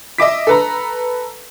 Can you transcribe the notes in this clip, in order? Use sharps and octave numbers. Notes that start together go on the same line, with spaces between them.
D#5 E5 D6 B6
A4 B4 A#5